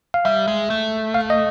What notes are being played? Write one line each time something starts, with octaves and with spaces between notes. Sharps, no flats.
F5
G3 E5
G#3
A3
F5
D#5